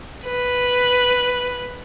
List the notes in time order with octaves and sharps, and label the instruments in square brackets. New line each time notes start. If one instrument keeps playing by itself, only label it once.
[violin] B4